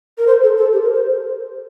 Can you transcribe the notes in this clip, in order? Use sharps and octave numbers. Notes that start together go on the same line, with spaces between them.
A#4
C5
A4
A4
G4
A#4
C5